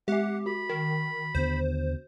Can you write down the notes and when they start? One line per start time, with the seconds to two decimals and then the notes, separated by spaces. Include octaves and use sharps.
0.08 G#3 G4 E5 F#5
0.46 F#4 B5
0.69 D#3
1.35 D#2 D3 B3 C5